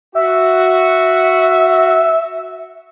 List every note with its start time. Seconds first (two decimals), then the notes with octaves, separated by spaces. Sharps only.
0.15 F#4 E5